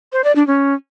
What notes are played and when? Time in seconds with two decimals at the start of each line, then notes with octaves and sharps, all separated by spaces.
0.12 C5
0.24 D5
0.36 D4
0.47 C#4